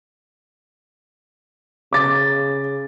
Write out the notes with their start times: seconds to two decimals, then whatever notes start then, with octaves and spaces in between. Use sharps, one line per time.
1.93 C#3 D6 A6